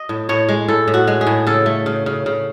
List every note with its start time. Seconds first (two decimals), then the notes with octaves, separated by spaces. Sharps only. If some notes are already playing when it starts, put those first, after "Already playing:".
Already playing: D#5
0.09 A2
0.29 A2 C#5
0.49 G#3
0.68 A2 A4
0.88 A2
0.94 F#4
1.07 G#3
1.21 G#4
1.27 A2
1.47 C#3 A4
1.66 A3
1.86 C#3
2.06 C#3
2.26 C#3